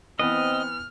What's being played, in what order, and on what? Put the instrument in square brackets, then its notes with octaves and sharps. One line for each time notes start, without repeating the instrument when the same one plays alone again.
[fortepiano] E3 B3 [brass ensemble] C4 [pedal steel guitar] D#5 [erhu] F6